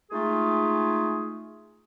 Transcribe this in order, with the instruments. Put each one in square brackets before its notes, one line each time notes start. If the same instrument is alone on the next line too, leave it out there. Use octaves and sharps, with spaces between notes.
[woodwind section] G#3 A3 D#4 F4 G#4